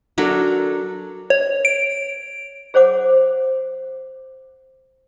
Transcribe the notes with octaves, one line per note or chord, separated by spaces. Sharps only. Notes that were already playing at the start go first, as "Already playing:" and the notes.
F#3 D4 A4 A#4
C#5
D7
G#4 C5 C#5 F#5 D6